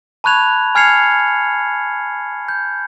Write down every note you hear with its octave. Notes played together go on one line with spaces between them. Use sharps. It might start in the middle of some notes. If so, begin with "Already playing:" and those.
A5 B5 C#6 F#6 G#6 F7
G#5 F6 G#6 C7 C#7 F7
G6